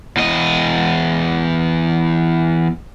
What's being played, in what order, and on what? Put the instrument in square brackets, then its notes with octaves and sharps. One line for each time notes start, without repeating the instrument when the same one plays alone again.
[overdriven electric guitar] E2 D#5